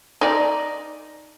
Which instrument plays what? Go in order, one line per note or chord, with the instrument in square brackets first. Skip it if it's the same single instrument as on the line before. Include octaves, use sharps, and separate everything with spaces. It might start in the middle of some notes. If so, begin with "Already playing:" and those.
[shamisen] D#4 D5